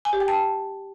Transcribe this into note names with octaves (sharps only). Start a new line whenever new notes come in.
G#5
G4
G5
A5